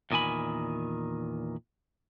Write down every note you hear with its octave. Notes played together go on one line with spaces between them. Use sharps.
E2 A#2 D#3 G#5 B5